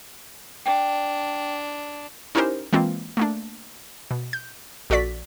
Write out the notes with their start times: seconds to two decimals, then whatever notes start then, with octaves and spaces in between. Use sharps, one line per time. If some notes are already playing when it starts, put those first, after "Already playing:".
0.66 D4 G5
2.35 C#4 D#4 E4 G4 A#4 C5
2.73 E3 G#3 A#3 C4 F4
3.17 A3 A#3 D4
4.11 B2
4.33 G6
4.90 A#1 F#4 A4 D5 B6